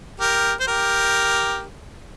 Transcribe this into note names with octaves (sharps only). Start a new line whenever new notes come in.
G4 A#4
C5
G4 A#4